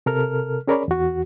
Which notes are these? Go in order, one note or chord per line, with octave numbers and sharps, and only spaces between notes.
C3 A4 A#4 F6
C#4 G#4 A#4 C#5 D5 B5
E2 F#4